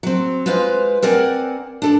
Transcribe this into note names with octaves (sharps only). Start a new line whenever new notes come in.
F#3 C4
G#3 F4 B4 C5 F5
C4 A#4 D5 F#5 G#5
D4 A4 D5